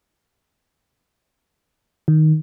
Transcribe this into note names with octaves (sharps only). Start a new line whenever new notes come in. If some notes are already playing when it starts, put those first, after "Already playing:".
D#3